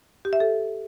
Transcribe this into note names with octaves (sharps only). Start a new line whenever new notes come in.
G4
E5
A4